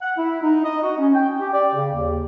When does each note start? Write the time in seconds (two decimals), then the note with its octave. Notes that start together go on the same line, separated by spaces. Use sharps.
0.01 F#5
0.18 E4
0.42 D#4
0.65 D#5
0.83 F#4
0.98 C#4
1.14 G5
1.40 G4
1.53 D5
1.74 C#3
1.94 D#2